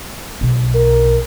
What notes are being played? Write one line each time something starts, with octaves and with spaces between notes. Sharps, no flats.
B1
A#4